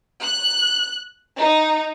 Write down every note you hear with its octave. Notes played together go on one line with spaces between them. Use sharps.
F#6
D#4